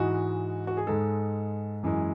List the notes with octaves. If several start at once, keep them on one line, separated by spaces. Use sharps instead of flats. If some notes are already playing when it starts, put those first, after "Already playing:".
Already playing: G#2 E3 G#3 F#4
F#4
G#4
G#2 G#3 A4
F#2 E3 G#3